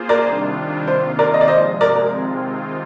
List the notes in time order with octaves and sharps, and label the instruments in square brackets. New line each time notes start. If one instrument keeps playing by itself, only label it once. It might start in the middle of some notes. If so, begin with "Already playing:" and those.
Already playing: [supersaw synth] A#3 F4 G#4 C5
[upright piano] A#4 D5
[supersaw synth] C3 D#3 G3 D4 F4
[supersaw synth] C3 D#3 A#3 F4 [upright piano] C5
[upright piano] A#4 D5
D#5
D5
[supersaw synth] C3 F3 G#3 [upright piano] C5 D#5
[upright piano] A#4 D5
A#4
[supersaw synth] C3 D#3 G#3 C4 F4